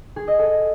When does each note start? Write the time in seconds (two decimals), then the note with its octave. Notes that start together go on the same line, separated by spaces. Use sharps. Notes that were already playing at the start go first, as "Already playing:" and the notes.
0.16 G#4
0.28 D#5
0.39 A4